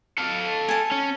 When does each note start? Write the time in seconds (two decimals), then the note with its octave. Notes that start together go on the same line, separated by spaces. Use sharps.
0.18 A4 F5
0.69 G#5 A5
0.91 C#4